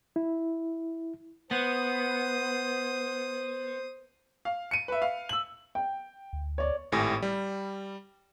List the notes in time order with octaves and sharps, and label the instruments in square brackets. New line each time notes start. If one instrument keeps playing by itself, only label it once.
[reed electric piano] E4
[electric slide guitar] B3 [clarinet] C5 [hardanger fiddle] D#6
[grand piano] F5
C#7 D#7
B4 E5
F5
E6 F#7
[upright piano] G5
[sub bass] D2
[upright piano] C#5 D5
[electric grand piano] G#1 A2 G4 G#5 A#6
G3